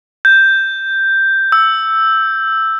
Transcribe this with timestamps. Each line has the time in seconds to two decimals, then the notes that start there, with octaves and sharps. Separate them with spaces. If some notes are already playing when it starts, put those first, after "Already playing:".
0.25 G6
1.52 E6